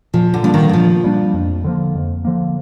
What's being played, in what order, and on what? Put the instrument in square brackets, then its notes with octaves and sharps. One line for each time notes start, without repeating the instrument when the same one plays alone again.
[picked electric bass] A#2 [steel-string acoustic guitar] F3
[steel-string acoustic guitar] D3
[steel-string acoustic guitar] F3 [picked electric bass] G3 A#3 D4
[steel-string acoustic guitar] D#3
D#3
[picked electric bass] A#2 [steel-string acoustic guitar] F3
[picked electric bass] G3 A#3 D4
F2
D3 F3 A#3
F2
D3 F3 A#3